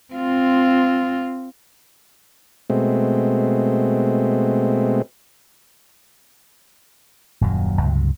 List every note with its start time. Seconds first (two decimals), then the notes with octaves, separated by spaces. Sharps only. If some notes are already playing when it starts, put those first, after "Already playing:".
0.14 C4 F4
2.70 B2 G#3 A3 C4
7.41 D#1 F#2 A#2 F#3
7.81 C#2 G2 C3 F#3